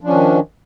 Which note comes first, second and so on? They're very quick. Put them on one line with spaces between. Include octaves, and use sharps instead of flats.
F3 D4 C#4 D#3